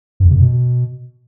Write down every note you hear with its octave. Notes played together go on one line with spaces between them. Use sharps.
G2
E2
C3
F#2
B2